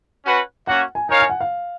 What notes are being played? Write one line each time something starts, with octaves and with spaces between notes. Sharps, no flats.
C#4 F#4 B4 F#5
A#3 C#4 F#4 F#5
G#5
D#4 A#4 C#5 F5 G#5
G#5
F#5
F5